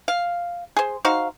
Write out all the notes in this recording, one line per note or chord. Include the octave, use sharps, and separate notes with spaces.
F5
G#4 C5
D#4 F#4 C5 F5